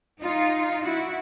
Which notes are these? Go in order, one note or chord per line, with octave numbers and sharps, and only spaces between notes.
D#4 F4
E4 F#4